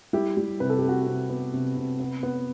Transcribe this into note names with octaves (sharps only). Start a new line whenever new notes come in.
G3 E4 G4
G3
C3 B4
A4
G4
C3
F#4 A4
C3
B3
C3
C3
B3
B3